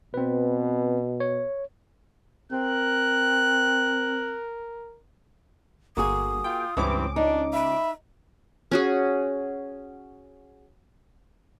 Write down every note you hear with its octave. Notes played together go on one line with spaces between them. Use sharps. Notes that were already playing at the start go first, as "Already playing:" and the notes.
B2 C4 B4
C#5
C4 A#4 F#6
G1 A#3 F#4 G#4 D#6
F4 G5
C#2 G2 E3 C4 C#4 D6
D4 D#4
E5 B5
C#4 F#4 G#4